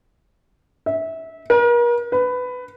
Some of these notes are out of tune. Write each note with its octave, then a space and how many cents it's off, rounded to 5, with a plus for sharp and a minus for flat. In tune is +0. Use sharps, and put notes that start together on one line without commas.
E5 -20
A#4 +40
B4 +15